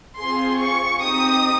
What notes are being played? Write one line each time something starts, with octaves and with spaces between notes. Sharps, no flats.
C4 F4 G#4 C6
C#6
C4 D#4 G4 D#6